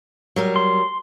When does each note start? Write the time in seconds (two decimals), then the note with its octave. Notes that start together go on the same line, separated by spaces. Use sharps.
0.36 F#3 G3 A#4
0.56 C6